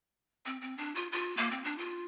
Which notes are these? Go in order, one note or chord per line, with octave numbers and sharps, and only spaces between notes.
C4
C4
D4
F4
F4
A#3
C4
D4
F4